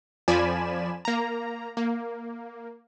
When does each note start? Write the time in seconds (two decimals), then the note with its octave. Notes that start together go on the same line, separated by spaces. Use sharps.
0.28 F2 F3 D5 G#5 B5 E7
1.05 A#3 A#5
1.77 A#3